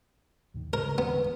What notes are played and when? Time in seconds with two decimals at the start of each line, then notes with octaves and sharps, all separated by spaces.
0.54 D#2 A2 D#3
0.73 A2 C#3 A#4
0.98 E2 D3 G#3 B3